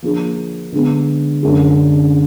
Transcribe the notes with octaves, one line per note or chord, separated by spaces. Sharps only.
F3 A#3 D4 F4 G#4
D3 G#3 B3
F#2 D3 G#3